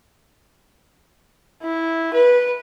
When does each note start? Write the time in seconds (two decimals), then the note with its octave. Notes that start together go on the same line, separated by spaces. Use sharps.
1.63 E4
2.13 B4